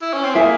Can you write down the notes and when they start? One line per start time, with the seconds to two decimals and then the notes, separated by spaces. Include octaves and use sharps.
0.02 E4
0.13 C#4
0.24 C4
0.35 A#3 E4 G#4 E5 G#5